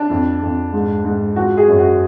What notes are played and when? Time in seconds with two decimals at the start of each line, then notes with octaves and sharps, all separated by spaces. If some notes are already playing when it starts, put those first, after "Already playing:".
Already playing: D4
0.10 F2
0.42 F2
0.73 G#2
1.04 G#2
1.36 F3 F#4
1.57 G#4
1.68 F#2
1.78 F#4